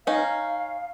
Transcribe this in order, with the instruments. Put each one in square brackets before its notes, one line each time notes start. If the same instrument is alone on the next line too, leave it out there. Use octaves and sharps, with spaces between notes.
[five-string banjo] C#4 D#4 [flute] F5